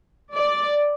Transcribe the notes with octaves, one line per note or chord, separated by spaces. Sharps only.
D5